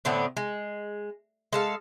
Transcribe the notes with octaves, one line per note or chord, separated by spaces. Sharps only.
A2 D3 B3 C4
G#3
G#3 A4 F5